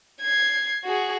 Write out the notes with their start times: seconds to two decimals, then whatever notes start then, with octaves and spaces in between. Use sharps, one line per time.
0.21 G#6 C7
0.84 F#4 G#4